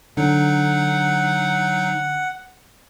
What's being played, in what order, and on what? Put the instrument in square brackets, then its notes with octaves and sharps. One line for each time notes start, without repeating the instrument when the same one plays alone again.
[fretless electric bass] D3 [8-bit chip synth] F#3 D#4 [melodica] F#5